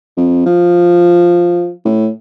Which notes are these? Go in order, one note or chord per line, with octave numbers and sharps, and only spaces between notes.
F2
F3
A2